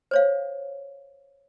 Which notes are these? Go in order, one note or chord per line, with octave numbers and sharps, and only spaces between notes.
C5 C#5 F5